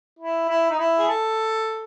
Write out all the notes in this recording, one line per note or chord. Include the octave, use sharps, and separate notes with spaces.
E4
E4
D#4
E4
G#4
A4